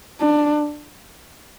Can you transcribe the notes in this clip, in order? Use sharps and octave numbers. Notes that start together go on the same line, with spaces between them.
D4